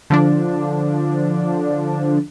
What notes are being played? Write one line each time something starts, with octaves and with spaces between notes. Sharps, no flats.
D3 F3 D4